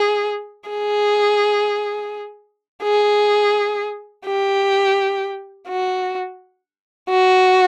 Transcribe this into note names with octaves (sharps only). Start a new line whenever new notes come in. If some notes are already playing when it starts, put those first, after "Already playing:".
Already playing: G#4
G#4
G#4
G4
F#4
F#4